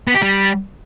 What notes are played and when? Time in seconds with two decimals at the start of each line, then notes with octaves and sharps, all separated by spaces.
0.07 B3
0.15 G4
0.22 G3